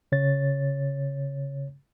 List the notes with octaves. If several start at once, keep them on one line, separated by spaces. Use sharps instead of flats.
C#3 C#5 A6